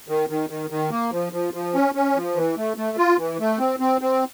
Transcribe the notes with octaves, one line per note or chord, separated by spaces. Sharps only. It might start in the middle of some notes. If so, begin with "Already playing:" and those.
D#3
D#3
D#3
D#3
A#3
F3
F3
F3
C#4
C#4
F3
E3
A3
A3
F4
E3
A3
C4
C4
C4